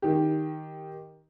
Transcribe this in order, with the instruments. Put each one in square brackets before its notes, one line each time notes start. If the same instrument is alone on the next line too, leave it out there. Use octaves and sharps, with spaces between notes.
[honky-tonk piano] D#3 G4